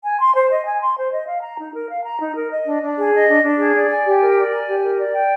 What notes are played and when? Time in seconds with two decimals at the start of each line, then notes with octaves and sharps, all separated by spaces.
0.04 G#5
0.20 C6
0.35 C5
0.51 D#5
0.66 G#5
0.81 C6
0.97 C5
1.13 D#5
1.28 F5
1.43 A#5
1.59 D#4
1.74 A#4
1.90 F5
2.05 A#5
2.21 D#4
2.36 A#4
2.52 D#5
2.67 D4
2.82 D4
2.98 G#4
3.13 D#5
3.29 D4
3.44 D4
3.59 G#4
3.75 D5
3.90 G#5
4.05 G4
4.21 A#4
4.37 D5
4.52 G#5
4.68 G4
4.83 A#4
4.98 D5
5.13 G5